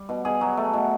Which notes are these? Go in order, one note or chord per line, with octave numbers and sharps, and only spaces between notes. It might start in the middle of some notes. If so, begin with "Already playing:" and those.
Already playing: G3
B2
B2 G#4
F#3
A3
B2